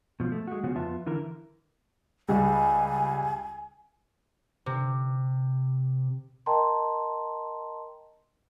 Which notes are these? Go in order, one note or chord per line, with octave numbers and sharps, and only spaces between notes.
B2 F3
A3
G#3 F#4
C#3 F3 B3 C#4 F#4
F2 B3 F4 E5 A5
D3 E3 E4 A#4
C#2 G3 G#5
C3
A#4 D#5 G5 A5 A#5 C6